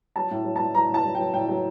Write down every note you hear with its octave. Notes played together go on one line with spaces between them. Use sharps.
F#3 A5
A2
F#3
A2 A5
F#3 A#5
A2
A5
F#3
F#3 G5
A2 G5
F#3